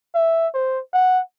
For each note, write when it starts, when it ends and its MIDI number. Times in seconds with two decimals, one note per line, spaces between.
0.15 0.47 76
0.54 0.80 72
0.94 1.21 78